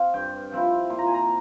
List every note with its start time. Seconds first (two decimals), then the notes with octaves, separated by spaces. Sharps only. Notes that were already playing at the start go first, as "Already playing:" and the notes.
Already playing: C4 F5
0.14 G2 G5
0.52 F3 C4 E4
0.90 A#2 C6
0.98 A#5
1.07 G#5
1.14 A#5